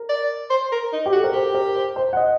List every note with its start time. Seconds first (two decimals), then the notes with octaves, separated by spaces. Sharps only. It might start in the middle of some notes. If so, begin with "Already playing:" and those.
Already playing: A#4
0.09 D5
0.50 C5
0.72 A#4
0.93 D#4
1.06 G4
1.12 F#4
1.16 A4
1.24 A#4
1.33 G4 C5
1.55 A#4
1.76 C5
1.96 C5
2.13 F#5
2.17 D#5